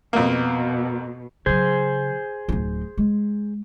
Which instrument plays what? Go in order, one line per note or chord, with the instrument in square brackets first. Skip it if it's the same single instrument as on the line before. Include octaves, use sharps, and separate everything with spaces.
[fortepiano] F2 A#3 [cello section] B2
[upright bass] C#3 F#3 [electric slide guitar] G#4 C5
[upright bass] D1 D#4
G#3